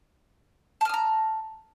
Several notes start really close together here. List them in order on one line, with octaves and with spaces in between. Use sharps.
A5 F6 D#6 A#5